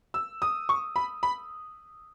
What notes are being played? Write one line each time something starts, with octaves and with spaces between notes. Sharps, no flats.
E6
D#6
C#6
B5
B5